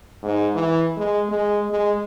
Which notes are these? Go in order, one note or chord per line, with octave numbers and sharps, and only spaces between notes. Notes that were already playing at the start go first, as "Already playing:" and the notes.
G#2
E3
G#3
G#3
G#3